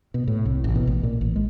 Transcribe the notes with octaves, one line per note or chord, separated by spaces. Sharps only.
B2
A2
C2
A1
B2
A1
A#2
A1
G#3